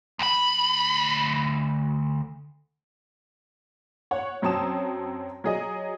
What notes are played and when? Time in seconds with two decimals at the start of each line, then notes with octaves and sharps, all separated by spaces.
0.19 D2 B5
4.11 C#5 F#5
4.42 F#2 F#3 C4 A5 D#6 E7
5.44 F#3 G#4 D#5